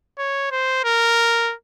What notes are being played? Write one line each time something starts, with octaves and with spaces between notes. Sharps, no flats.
C#5
C5
A#4